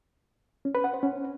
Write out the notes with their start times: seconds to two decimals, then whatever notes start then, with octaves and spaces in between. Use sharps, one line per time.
0.65 C#4
0.75 B4
0.84 F#5
0.94 C5
1.03 C#4